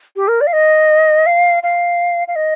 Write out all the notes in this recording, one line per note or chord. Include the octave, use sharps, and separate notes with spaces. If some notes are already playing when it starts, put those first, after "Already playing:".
G4
A#4
D5
F5
D#5
F5
F5
F5
D#5